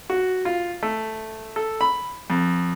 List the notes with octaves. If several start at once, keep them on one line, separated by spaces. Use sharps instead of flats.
F#4
F4
A3
A4
B5
F2